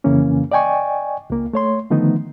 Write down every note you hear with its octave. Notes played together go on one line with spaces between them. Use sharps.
F2 C#3 E3 A#3 C#4
D5 D#5 G5 G#5 C#6
C#2 A#3
A3 C#5 C6
D3 D#3 F3 A3 B3 D#4